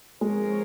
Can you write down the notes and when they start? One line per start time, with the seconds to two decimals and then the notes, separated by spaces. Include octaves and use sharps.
0.21 F3 G#3 C4 D#4 A#4 C#5